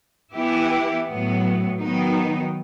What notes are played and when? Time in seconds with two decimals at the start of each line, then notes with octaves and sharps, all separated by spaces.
0.34 E3 B3 E4 G4
1.06 A2 F#3 B3
1.80 D#3 F#3 B3 D#4